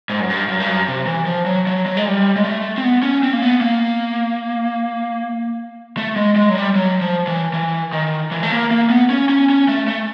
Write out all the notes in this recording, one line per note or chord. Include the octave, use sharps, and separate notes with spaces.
G#2
F#2
G2
F#2
G2
F#2
C3
E3
F3
F#3
F#3
F#3
G#3
G3
G#3
A3
C4
B3
C#4
C4
A#3
B3
A#3
A3
G#3
G#3
F#3
G3
F#3
F3
E3
E3
D#3
E3
A3
A#3
A#3
B3
C#4
C#4
C#4
A3
A3